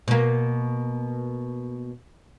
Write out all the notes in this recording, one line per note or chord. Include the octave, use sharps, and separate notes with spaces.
B2 A#3